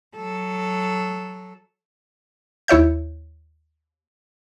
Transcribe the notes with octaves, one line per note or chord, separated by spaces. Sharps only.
F#3 A4
D#2 E4 C#5 E5 G6